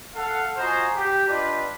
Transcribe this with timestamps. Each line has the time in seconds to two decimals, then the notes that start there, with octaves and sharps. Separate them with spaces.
0.15 A4 F5 F#5
0.56 F4 F#4 C5 D#5 G#5 A#5
0.94 G4
1.26 D4 F4 G4 B4 D5 D#5